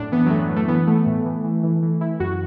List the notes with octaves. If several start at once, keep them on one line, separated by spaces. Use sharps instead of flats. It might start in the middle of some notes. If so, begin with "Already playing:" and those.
Already playing: F#2 A2 D4
E3 B3
F#3
A2 A3
F#3
E3
A3
E3 B3
E3 A3
A2
E3
E3
E3
E3
E3 E4
F#2 F#4